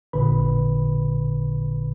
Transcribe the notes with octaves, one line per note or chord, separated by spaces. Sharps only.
A1 A#2 D3 B4 B5